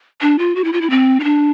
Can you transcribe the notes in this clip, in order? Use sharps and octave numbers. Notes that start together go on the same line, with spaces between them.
D4
F4
F#4
E4
F4
E4
C4
D#4
D4